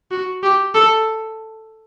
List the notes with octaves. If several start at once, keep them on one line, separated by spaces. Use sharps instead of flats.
F#4
G4
A4